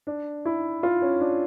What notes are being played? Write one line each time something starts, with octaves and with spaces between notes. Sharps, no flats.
D4
E4
F4
C#4
D4